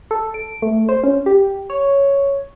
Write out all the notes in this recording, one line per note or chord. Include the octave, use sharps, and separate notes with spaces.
A4
D7
A3
C5
C#4
G4
C#5